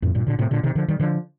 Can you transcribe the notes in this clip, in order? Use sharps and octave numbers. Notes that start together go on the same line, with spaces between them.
F2 A2
G2 A#2
A#2 D3
A2 C3
A#2 D3
C3 D#3
D3 F3
D#3 G3
D3 F3